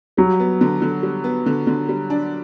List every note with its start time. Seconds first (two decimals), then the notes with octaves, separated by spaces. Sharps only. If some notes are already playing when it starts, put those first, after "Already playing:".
0.17 F#3 G3
0.40 B3
0.61 D3
0.82 D3
1.03 G3
1.24 B3
1.46 D3
1.67 D3
1.89 G3
2.10 D4